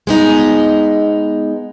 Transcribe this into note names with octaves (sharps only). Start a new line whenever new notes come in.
G#3 B3 D#4